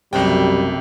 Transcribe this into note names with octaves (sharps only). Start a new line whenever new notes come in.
B1 F#2 C3 G3 A3 G5